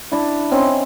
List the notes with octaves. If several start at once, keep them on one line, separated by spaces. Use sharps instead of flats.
D4 E4
C4 C#4 D#5 C6